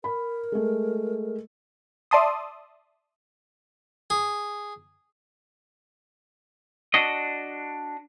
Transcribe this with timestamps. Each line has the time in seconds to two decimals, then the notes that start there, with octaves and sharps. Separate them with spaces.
0.04 A#4 B5
0.52 G#3 A3
2.11 D5 E5 A5 C6 D#6
4.10 G#4
6.94 D4 F#4 D#5